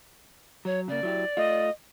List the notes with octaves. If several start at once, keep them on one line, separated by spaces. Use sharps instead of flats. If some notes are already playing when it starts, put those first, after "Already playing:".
F#3 C#5
C#3 A#3 D5
F#3 E4 G4
A3 F4 D#5